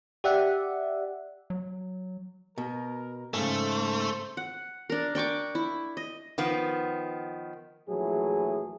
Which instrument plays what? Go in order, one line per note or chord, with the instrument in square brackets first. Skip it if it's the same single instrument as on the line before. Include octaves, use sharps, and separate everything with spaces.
[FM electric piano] G4 D5 E5 F#5
[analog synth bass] F#3
[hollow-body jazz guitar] B2 [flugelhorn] A#4
[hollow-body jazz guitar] G#2 C#3 [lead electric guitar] A3 [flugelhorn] C5
[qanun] F#5
D4 A#4
D4 G5 C#6 D6
E4
D#5
[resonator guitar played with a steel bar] D#3 F3 B3
[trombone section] A#1 E3 F#3 A3 E4 G#4